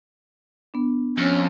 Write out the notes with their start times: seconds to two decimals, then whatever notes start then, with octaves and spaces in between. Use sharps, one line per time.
0.74 B3 D4
1.18 F2 C#4